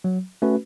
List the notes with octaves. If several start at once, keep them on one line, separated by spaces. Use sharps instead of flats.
F#3
A3 C#4 F#4 B4